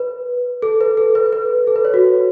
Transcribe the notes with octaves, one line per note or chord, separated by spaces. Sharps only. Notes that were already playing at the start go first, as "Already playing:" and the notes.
Already playing: B4
A4
B4
A4
B4
B4
A4
B4
C#5
F#4